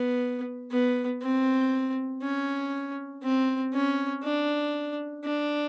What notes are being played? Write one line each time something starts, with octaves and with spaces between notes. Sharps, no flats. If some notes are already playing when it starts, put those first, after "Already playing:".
Already playing: B3
B3
C4
C#4
C4
C#4
D4
D4